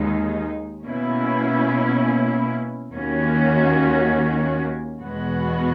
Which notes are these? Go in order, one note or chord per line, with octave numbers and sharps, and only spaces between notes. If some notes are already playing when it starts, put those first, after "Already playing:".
Already playing: D#2 D#3 G#3 D#4
B2 A#3 C#4 E4
D#2 D#3 A#3 C#4 F#4
E2 B2 G#3 B3 F#4